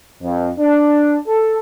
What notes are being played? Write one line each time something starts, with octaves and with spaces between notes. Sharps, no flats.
F2
D4
A4